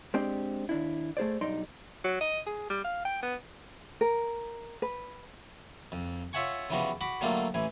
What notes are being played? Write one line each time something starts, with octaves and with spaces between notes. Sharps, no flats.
G#3 C4 D4 G4 D5
D#2 D4 E4
A3 G#4 C5 D5
B1 G2 D#4 D5 C6
F#3
D#5
G#4
G3
F5
G5
B3
A#4
B4
F2
F4 C#5 E5 F#5 G#5 C#6
C#3 E3 F3 G3 B3 F#4
F#4 B5 D6
D3 F#3 G3 A3 A#3 F4
A1 E3 G#5